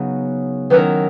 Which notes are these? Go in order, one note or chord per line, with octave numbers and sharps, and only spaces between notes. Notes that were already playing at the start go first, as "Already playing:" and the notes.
Already playing: C#3 F#3 B3 D#4
D#3 F#3 C#4 E4 A#4 B4